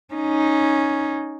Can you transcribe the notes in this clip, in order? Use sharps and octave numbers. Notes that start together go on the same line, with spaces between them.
C#4 D#4